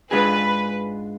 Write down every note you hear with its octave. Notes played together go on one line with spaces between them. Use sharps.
G#2 G#3 D4 F4 G#4 B4